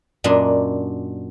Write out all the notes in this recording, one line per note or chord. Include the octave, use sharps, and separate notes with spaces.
F#2 A#2 D4 D#5